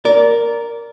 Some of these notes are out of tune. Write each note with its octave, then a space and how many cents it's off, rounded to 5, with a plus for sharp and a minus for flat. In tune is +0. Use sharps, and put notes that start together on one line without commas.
A#4 +0 D5 -20